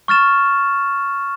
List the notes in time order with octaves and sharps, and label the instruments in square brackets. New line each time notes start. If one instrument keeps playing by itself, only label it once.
[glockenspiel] C#6 F6 A6 E7